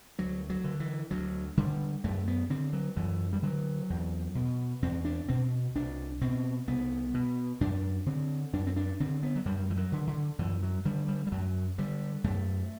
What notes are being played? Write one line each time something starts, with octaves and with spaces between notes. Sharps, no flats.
D2 F#3
F#3
D3
E3
D2 F#3
D3 G3
F#2 A3
B3
D3 C4
F#3
F#2 E3
G3
D3 F#3
E2
B2
E2 C4
D4
B2 C4
C2 D4
B2 C4
C2 B3
B2
F#2 D4
D3 C4
F#2 D4
C4
D4
D3 C4
B3
F#3
F#2 G3
E3
F#3
D3
D3
F#2 E3
F#3
D3 G3
G3
G3
F#2 F#3
D3 G3
F#2 A3